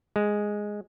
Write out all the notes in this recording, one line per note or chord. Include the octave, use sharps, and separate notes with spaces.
G#3